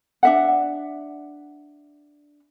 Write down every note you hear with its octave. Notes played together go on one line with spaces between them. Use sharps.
D4 E5 F#5